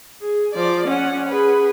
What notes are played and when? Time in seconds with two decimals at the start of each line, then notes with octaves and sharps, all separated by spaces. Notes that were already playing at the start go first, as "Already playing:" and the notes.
0.21 G#4
0.55 F3 D5
0.88 C#4 F#5
1.29 G#4 B4